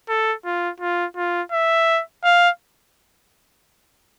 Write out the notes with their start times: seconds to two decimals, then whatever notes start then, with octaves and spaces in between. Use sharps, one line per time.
0.09 A4
0.45 F4
0.81 F4
1.17 F4
1.52 E5
2.24 F5